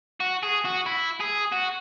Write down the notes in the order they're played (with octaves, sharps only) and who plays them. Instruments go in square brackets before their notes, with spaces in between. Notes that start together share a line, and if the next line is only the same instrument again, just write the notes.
[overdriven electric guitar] F#4
G#4
F#4
E4
G#4
F#4